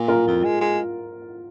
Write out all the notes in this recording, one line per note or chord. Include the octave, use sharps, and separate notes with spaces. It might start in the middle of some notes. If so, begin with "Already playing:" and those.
Already playing: A#2
F4 A#4
F2
G#3
G#3